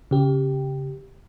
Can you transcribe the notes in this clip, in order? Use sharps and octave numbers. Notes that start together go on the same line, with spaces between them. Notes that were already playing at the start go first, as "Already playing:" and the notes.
C#3 G4